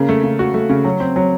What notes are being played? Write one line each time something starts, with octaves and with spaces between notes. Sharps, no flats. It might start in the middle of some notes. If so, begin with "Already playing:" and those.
Already playing: C#3 A#3
A3
C#3
F#4
A3
C#3
F#3
C4
F#3